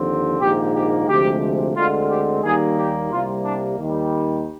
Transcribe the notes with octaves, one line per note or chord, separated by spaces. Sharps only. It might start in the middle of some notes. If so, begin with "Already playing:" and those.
Already playing: D#2 D3 F3 C4
A#1 G#2 D#3 A#3 G4
G4
D2 C3 F3 G#3 G4
D2 D3 G#3 C4 F4
G4
D#2 D#3 G3 A#3 G#4
G4
C2 C3 G3 A#3 F4
D4
D#2 D#3 G3